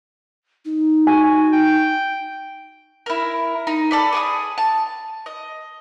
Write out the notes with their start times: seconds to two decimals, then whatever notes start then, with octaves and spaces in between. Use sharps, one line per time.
0.65 D#4
1.07 F#4 G#5
1.53 G5
3.06 E4 A#4
3.67 D#4
3.91 A4 D5 B5
4.12 G#4 D6 D#6
4.58 A5
5.26 D#5